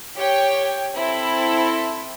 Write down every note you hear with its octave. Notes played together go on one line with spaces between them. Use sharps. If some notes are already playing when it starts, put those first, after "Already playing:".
G4 C#5 G5
C4 E4 A4